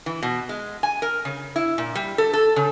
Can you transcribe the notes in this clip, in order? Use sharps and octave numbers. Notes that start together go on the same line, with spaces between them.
E3
B2
G#3
G#5
A#4
C#3
E4
A#2
G3
A4
A4
C#3